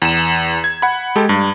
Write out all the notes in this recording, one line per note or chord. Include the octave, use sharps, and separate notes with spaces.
E2 E7
G#6
F#5 B5
G#3 G4 A4
G2